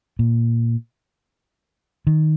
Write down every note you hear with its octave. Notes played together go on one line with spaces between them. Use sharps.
A#2
D#3